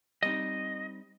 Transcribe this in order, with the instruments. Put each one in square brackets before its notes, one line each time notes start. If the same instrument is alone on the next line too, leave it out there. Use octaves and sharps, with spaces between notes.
[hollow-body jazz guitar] G3 C4 D#4 [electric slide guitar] D#5